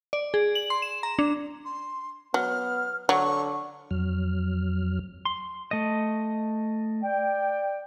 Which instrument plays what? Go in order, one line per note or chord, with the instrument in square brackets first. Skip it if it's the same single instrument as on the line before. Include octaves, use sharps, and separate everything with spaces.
[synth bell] D5
G#4
F#7
C6
E7
A#5
D4
[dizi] C6
[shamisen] F#3 [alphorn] B3 [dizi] F6
[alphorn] D3 [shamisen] F#3 [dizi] C#6
[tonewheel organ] F2 F#3 F6
[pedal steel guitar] C6
A3 D#5
[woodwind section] D5 G5